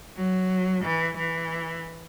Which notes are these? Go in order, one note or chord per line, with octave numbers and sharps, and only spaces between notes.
F#3
E3
E3